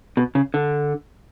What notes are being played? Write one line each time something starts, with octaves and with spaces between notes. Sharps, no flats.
B2
C#3
D3